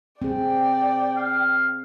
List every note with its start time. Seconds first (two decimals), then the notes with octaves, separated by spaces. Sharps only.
0.22 C4 G#4 D5 G5
1.17 F5